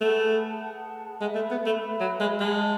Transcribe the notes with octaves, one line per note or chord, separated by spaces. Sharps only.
A3 G#4 B4 F#5 A5
G#4 B4 F#5 A5
G#3 B4 E5 B5
A3
B3
A3
B4 E5 B5
F#3
G#3
G#3 G#4 D#5 F#5 A5